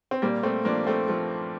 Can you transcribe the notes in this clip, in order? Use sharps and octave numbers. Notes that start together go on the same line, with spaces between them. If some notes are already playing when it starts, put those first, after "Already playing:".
C4
A#2 G3 A#3
A3 C4
F3 A#3 D4
A3 C4
F3 A3